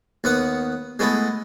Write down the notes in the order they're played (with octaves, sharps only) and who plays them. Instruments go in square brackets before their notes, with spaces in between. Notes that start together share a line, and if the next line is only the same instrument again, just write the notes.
[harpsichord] D#2 B3 F#5
G#3 A3 B3 E4